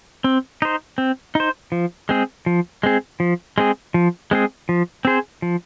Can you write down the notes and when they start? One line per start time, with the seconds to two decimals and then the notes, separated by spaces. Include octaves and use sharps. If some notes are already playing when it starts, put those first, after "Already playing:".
0.24 C4
0.62 D#4 C5
0.98 C4
1.35 D#4 C5
1.72 F3
2.09 G#3 C4 G#4
2.46 F3
2.83 G#3 C4 G#4
3.20 F3
3.58 G#3 C4 G#4
3.94 F3
4.31 G#3 C4 G#4
4.69 F3
5.05 C4 G#4 C5
5.42 F3